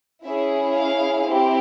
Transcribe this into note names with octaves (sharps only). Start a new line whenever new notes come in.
C#4 E4 G#4 E5
F5
C4 E4 G4